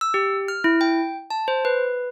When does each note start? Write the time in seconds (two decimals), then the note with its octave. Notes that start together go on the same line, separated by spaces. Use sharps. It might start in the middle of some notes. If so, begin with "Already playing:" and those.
0.01 E6
0.14 G4
0.48 F6
0.64 E4
0.81 G5
1.30 A5
1.48 C5
1.65 B4